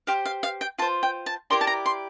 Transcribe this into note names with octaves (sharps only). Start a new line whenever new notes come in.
G4 C5 F5
F5
F5
G5
F4 C5 A5
G5
A5
E4 G4 A#4 D5 C6
A5
A#5
C6